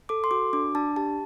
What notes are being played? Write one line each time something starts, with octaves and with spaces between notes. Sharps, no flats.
A4 D6
C6
F#4 D6
D4 D6
D4 A5
G4 A5